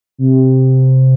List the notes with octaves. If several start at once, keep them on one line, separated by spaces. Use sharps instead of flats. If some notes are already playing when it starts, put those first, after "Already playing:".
C3